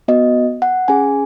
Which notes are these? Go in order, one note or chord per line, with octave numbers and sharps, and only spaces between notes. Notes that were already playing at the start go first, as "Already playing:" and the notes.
B3 F#4 D#5
F#5
C#4 G#4 G#5